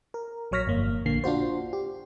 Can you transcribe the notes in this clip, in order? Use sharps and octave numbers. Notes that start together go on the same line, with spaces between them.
A#4
A#1 F#3 C#5 F6 A#6 B6
G1 F2 A#3
A#1 D3 A#3 C7
D4 F4 F#4 C5
G4